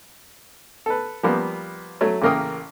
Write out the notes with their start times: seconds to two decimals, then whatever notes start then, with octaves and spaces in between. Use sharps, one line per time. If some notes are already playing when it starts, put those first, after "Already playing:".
0.86 A4 B4
1.23 F3 G3 A#3 B3
2.01 F#3 A3
2.22 A1 C#3 A#3 A#4 G5 D#6